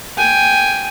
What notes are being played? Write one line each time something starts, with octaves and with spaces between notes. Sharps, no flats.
G5 G#5